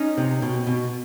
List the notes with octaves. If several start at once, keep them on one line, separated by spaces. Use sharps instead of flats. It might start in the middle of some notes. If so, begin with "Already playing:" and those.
Already playing: C#4 D#4
C3
B2
B2